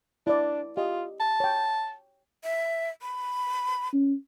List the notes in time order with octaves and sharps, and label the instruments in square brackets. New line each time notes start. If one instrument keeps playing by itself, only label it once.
[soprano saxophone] D4 [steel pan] E4 D5
[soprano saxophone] F4 [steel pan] G4 D#5
[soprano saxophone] A5
[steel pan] C#5 G5
[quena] E5
B5
[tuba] C#4